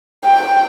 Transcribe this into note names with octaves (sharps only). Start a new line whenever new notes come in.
G5